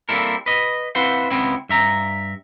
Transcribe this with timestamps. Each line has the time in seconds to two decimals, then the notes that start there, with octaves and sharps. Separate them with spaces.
0.09 G3 A#3 C4 E4 A4 A#4
0.46 B4 D#5
0.95 C4 E4 B4 C5 F5 F#5
1.31 C#2 B3 C4 E4
1.69 G2 E5 A#5